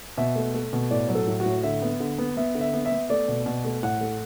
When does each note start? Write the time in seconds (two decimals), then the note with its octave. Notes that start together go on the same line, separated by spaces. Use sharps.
0.18 B2 E5
0.36 A3
0.54 A3
0.73 B2
0.91 A2 D5
1.09 F#3
1.15 A4
1.27 A2
1.40 F#4
1.46 A2
1.63 D3 E5
1.82 B3
2.00 D3
2.18 B3
2.37 B3 E5
2.55 D3
2.61 E5
2.74 B3
2.86 E5
2.92 B3
3.10 A3 D5
3.28 B2
3.46 B2
3.65 A3
3.83 A2 F#5
4.01 A3